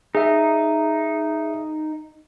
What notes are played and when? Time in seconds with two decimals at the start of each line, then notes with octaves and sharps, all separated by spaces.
0.15 D#4 G#4 E5